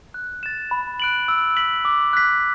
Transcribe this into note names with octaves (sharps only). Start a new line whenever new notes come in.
F#6
A6 E7
B5
F#6 D7 F#7
E6
B6 F#7
D6
F#6 B6